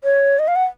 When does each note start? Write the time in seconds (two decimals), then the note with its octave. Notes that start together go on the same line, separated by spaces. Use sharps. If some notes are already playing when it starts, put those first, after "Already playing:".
0.04 C#5
0.39 D#5
0.48 F5
0.56 F#5